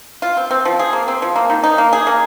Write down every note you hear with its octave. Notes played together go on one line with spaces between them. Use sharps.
F4
C4
C4
F3
G#4
A#3
C4
F3
A#3
D#3
D#4
A#3
G#4
A#3